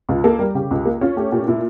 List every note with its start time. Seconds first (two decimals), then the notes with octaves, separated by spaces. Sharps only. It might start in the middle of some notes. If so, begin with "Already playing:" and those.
0.09 C#2 F4
0.24 A#3 A4
0.39 G3 A#4
0.55 C#3 G4
0.71 C#2
0.85 A#3
1.01 C#4 F4
1.17 A3 G4
1.32 A#2 G4
1.48 A#2 E4